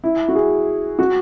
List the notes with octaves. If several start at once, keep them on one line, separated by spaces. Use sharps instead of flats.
E4
F#4
G#4
F#4